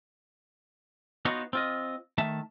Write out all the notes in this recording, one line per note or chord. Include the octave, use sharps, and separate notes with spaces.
B3 D#4 F4 F#4 C#5
C4 F4 D#5
D#3 A3 E5 A5